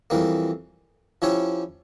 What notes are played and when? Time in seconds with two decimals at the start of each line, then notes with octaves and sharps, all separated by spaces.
0.10 F2 E3 G3 A#3
1.22 F3 C#4 E4 G4 C#5